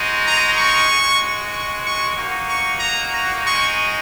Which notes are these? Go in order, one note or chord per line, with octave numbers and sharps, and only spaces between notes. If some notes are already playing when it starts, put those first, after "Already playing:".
Already playing: G#3 D#4 F#4
A#5
C#6
G#3 F#4
C#6
C#6
A#3 D#4 F#4
C#6
A#5
A#5
G#3 D#4 F#4 C#6